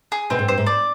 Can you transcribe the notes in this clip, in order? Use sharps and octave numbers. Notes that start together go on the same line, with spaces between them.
G#4
B2 C4
G#2
G2 C5
G#2
D5